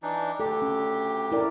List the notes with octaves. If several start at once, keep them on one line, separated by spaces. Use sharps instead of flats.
E3 D4 D#4
D2 G4 A4
C#4
E4 A#4 D5